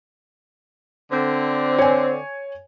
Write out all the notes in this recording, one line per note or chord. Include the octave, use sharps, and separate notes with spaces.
D3 C4
C#5 G#5